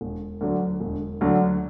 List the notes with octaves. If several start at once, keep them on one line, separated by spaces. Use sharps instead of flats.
E1
D2 D3 F#3
E1
D2 D3 F#3